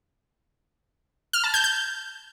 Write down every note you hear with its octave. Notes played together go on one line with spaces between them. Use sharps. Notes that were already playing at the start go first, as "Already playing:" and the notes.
F6
A5
G6
G6